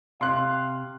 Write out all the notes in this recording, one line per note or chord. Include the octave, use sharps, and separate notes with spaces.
C3 F5 C6 F#6